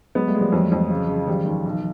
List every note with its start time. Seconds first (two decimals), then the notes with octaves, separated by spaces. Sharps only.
0.15 F#3 G#3 B3
0.28 G3 A3
0.35 G#3
0.41 F3 G3
0.52 F2 E3 F#3
0.72 F2
0.90 C#3
1.08 C#3
1.28 D#3 F3 G3
1.46 D#2
1.66 B1